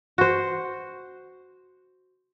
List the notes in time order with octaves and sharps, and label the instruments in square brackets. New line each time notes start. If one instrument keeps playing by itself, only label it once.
[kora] F#4 C5